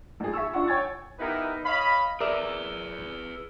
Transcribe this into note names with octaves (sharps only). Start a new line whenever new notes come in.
A#1 G#4
E5 G#5 C#6 E6
D4 F4 F#5 C#6
C#5 G5 G#5 C#6 G#6 A6
B3 D#4 E4 G4 A#4 B4
C#5 D#5 F5 B5
G#4 A#4 B4 D5 E5